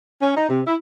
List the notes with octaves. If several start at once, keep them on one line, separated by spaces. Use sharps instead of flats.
C#4
D#4
C3
E4